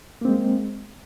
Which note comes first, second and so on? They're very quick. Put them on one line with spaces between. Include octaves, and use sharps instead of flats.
A#3 C4 G#3